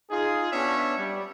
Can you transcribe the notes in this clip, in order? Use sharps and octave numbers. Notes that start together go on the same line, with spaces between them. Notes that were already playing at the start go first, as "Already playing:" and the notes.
D#4 F4 G#4
B3 C#4 D4 C#5 E5
G3